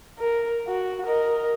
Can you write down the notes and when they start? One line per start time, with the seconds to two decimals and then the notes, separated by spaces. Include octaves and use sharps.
0.19 A#4
0.68 F#4
1.06 A#4 D#5